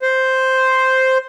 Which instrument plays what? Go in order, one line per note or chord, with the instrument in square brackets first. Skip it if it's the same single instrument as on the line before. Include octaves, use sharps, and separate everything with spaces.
[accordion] C5